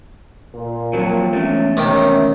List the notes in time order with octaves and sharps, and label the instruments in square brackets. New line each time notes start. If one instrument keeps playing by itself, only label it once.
[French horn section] A#2
[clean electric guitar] F3 F#3 [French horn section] A#3 C4
[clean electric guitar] E2 G#3 A3 [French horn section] C#4
[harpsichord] C3 D#3 G5 [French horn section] C#4